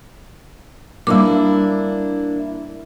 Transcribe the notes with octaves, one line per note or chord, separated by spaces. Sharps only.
G3 A#3 D4 E4 D6